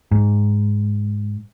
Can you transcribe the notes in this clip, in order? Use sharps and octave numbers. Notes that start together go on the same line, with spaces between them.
G#2